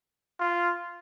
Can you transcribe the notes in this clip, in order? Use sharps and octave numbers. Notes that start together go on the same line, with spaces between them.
F4